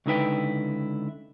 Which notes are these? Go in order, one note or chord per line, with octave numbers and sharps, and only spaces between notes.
C#2 D3 D#4 E4 B4 G5